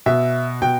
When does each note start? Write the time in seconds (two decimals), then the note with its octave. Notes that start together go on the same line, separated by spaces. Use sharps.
0.06 B2 E5
0.62 B2 G5